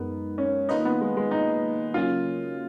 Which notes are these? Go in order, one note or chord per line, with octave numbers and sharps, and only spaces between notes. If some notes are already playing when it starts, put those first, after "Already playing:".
Already playing: F#2 G#3 B3 D#4 A#4
C#4
D#3 A#3 D#4 F4 B4 D#5
B3
G#3
G#3
D#4
C#3 F#3 A#3 C#4 F4